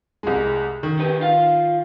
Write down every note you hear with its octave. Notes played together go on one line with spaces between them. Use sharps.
C2 G#3
D#3
D#4 G4 B4
F4 F5